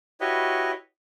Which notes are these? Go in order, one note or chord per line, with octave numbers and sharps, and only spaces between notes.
E4 F#4 G4 B4 C#5 D#5